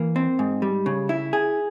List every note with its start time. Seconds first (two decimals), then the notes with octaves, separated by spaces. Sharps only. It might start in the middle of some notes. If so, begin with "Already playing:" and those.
Already playing: E3 A#3
0.16 C4
0.39 G#2
0.62 G3
0.86 C#3
1.09 E4
1.33 G#4